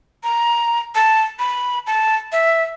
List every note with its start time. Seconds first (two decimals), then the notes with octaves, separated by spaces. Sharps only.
0.24 A#5
0.95 A5
1.39 B5
1.87 A5
2.32 E5